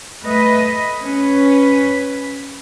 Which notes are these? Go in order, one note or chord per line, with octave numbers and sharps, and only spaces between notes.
A3 B4 D#5
C#4 B4